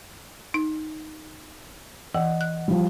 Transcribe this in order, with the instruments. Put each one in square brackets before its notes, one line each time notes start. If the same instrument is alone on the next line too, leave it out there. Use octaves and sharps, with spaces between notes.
[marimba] D#4
[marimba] E3 [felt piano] D#5 F#5
[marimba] F#6
[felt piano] F3 G3